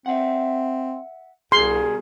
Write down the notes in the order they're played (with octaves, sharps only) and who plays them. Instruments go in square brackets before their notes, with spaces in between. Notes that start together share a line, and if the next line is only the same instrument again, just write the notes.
[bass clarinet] C4 [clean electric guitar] E5 F#5
[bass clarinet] C2 [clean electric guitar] B2 G3 A#4 [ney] G#4 [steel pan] C6